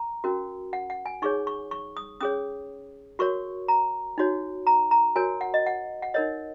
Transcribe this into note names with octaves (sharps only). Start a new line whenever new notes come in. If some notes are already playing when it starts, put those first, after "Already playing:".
Already playing: A#5
C#4 F#4 A#4
F#5
F#5
G#5
D#4 G#4 C#5 C#6
C#6
C#6
D#6
C#4 G#4 C#5 D#6
F#4 A#4 C#5 C#6
A#5
D#4 F#4 C#5
A#5
A#5
F#4 A#4 C#5 G#5
F#5
D#5
F#5
F#5
D#4 A#4 C#5 D#5